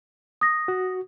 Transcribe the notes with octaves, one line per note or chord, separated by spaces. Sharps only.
D#6 A#6
F#4